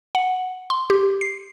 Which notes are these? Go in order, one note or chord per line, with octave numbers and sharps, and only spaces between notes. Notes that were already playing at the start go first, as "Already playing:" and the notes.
F#5
C6
G4
C7